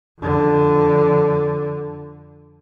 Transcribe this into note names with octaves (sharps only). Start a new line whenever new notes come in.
F2 D3